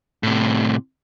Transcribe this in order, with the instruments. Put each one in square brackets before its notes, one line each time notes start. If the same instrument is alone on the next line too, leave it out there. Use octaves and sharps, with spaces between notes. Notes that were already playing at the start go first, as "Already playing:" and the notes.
[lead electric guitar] A2 C3